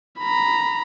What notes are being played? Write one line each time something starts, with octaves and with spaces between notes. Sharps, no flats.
A#5 B5